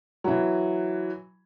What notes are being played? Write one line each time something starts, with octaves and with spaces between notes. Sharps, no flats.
E3 F#3